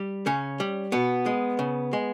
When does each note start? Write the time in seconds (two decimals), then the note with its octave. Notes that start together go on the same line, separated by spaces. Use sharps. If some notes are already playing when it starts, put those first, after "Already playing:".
Already playing: G3
0.26 C#3 C#4
0.60 G3
0.92 B2 B3
1.26 G#3
1.59 C#3
1.93 G#3